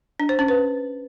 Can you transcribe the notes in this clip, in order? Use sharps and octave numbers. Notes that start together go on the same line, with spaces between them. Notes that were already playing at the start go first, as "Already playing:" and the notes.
D4
C5
C#4
B4